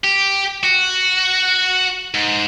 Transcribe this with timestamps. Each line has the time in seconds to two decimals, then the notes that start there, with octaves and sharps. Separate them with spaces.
0.04 G4
0.63 F#4
2.14 G#2